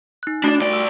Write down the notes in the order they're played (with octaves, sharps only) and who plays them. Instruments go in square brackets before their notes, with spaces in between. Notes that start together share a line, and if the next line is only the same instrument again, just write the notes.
[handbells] D#4 F#6
[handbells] A3 F#4 [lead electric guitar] D4 D5
[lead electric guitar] C2 D5
[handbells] E6